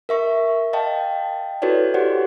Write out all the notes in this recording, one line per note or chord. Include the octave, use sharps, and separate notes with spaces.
A#4 E5 C#6
D#5 F5 G5 A5
E4 F#4 A4 B4 C#5 D5
F#4 G4 C5 D5 F#5